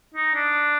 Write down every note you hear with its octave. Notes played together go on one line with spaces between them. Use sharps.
D#4
D4